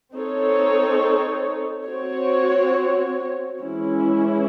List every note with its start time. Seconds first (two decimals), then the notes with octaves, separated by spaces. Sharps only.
0.12 C4 D#4 A4 C#5
1.86 C4 F#4 C#5
3.61 E3 G#3 C#4 E4